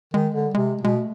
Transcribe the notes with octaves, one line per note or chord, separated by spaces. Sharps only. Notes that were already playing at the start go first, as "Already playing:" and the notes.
D#3 G#3
D3
G3
C3 G#3
B2 G#3
A3